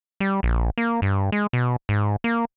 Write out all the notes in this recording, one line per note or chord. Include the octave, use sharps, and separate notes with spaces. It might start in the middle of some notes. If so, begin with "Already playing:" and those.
G3
A#1
A#3
G2
G#3
B2
G#2
A#3